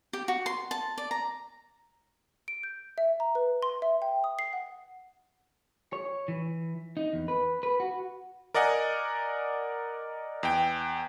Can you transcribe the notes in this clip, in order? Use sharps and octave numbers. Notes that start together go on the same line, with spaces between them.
G4
F#4
C6
A5
D5
A#5
D7
G6
E5
A#5
B4
C6
E5
G5
D#6
C7
F#5
C#5
E3
D#4
E2
B4
B4
F#4
A#4 D5 D#5 F#5 G#5
E2 G5 D7